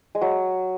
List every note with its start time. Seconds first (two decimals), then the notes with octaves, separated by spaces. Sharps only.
0.15 G#3
0.21 F#3